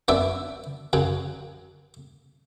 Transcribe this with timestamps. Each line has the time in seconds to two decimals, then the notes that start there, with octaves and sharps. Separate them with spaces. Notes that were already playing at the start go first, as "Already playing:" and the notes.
0.08 F#2 B3 D4 E5
0.93 F#2 C#3 F#3